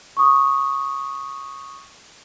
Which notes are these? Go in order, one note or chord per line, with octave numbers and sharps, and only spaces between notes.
C#6 D#6